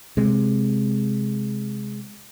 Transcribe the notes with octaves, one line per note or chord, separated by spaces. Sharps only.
C3 G#3